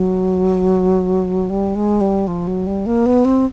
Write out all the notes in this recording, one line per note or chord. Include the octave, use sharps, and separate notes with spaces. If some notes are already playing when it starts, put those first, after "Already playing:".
Already playing: F#3
G3
G#3
G3
F3
F#3
G3
A#3
B3
C4